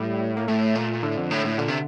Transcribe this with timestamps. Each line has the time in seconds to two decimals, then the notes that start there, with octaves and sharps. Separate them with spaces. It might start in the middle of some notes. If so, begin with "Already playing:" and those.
Already playing: A2 G3
0.37 A#3
0.48 A2 A3
0.75 A#2
1.03 A2 D3
1.17 F2
1.31 A2
1.45 A2
1.58 A#2 D3
1.68 C3